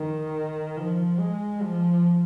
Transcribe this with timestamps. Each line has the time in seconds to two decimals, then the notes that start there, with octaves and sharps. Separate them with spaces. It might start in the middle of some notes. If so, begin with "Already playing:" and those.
Already playing: D#3
0.77 F3
1.20 G#3
1.63 F3